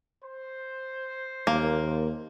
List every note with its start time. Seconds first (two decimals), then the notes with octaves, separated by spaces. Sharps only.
0.23 C5
1.47 D#2 A#3